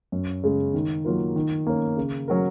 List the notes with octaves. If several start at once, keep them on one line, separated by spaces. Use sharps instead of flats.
F#2
C#3 G#3
D#3
F#3 A#3 F4 A#4
D#3
A#3 C#4
C#3
F#3 C#4 F#4 A#4